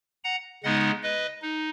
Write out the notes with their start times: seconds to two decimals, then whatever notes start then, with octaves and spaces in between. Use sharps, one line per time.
0.24 F#5 A#5
0.64 C#3 G#3 B3 D#4 D#5 F#5
1.03 B4 D#5
1.42 D#4